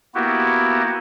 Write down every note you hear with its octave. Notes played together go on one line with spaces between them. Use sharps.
A#3 B3 E4 F#4 G4